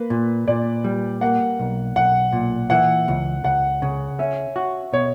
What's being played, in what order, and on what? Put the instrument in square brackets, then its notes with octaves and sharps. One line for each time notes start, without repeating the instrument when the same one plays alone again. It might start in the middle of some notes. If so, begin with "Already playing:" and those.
Already playing: [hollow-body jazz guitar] A#3 [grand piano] B4
[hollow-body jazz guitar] A#2
[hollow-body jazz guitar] A#2 [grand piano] D5
[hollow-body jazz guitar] G3
[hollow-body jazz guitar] A#3 [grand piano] F#5
[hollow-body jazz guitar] B1
[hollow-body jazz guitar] B1 [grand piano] F#5
[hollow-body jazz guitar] A#2
[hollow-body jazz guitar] E3 [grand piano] F#5
[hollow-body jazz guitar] C#2
[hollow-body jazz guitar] C#2 [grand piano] F#5
[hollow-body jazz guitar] C#3
[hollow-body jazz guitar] C#4 [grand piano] E5
[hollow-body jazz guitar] F#4
[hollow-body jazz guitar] B2 [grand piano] C#5